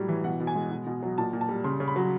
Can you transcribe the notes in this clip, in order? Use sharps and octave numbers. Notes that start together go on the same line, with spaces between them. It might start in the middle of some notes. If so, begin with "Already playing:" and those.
Already playing: A2 F#3 G3
E3
B2 F#5
B2
G#5
G#3
B2
B2
F#3
A#2 A5
A#2
A5
G3
C#3 C6
C#3
B5
F#3